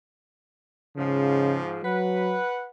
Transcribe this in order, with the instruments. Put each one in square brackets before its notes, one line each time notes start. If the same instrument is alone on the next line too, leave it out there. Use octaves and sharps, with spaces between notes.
[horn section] G#2 F3 [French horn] C#3
[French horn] F#3 [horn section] B4 F#5